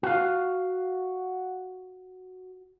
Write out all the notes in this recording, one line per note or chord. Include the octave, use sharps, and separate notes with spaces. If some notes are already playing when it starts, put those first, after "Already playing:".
F#4 F5